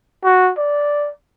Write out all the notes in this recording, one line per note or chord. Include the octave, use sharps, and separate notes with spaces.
F#4
D5